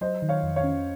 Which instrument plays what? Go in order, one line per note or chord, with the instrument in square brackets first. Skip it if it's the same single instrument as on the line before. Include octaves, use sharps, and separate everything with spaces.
[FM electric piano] F#3 [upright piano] C5 D#5
[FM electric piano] D#3
[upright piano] C#5 F5
[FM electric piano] F2
[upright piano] C#5 F5
[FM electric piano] C#4